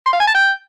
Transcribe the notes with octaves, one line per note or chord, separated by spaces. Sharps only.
C6
F5
G#5
A5
G5